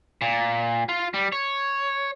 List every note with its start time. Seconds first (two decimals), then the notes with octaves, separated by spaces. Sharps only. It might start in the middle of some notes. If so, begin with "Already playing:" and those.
0.21 A#2
0.89 F4
1.14 G3
1.32 C#5